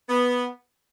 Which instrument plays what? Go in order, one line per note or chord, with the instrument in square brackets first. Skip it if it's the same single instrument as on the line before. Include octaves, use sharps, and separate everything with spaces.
[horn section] B3